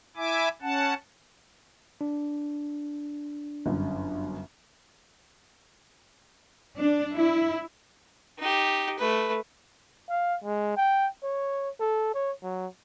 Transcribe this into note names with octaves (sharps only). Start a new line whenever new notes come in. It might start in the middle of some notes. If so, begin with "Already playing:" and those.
E4 E5 G#5 D6
C#4 F#5 A5
D4
G1 F#2
D4
E4
D#4 G4
A3 B4
F5
G#3
G5
C#5
A4
C#5
F#3